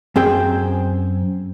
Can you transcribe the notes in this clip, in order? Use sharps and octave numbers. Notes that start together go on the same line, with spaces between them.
F#2 C4 G#4 G5